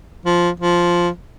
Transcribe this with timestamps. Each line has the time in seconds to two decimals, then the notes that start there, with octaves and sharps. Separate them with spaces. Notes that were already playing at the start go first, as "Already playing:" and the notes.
0.26 F3
0.60 F3